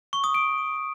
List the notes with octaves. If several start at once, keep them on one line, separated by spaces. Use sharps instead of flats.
C#6
D#6
D7